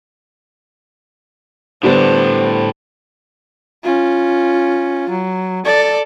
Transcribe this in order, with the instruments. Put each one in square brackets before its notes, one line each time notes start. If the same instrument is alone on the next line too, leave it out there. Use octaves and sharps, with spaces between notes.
[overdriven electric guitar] A2 D4 [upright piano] D3 G3 B3 [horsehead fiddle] C5
[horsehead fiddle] C#4 F4
F#3
A4 D5